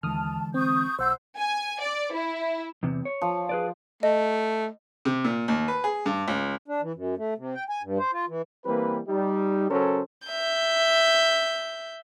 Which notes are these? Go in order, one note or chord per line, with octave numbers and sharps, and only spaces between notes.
D#2 D3 E3 G#3 A5 D#6 F6
C4 C#6 D#6 G6
B1 C5 F#5 C6 E6 G6
G#5
D5
E4
E2 C3
C#5
F3
G#4 B4 D5
A3 D#5
C3
A#2
D#2
B4
G#4
G2
C#2
D4
E3
F#2
A3
C3
G5
G#5
G2
C5
F4
E3
E3 G3 A#3 C4 B4
G3 D#4
C#3 F#3 C#4 A4 A#4 C5
E5 G6